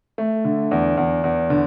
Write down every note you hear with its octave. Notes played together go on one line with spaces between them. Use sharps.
A3
D3
E2
E2
E2
D3